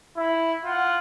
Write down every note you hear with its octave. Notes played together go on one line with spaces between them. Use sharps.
E4
F4 F#5